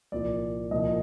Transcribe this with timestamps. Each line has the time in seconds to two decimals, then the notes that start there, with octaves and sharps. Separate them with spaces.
0.12 C2 A#2 F3 D5
0.71 C2 A#2 F3 D#5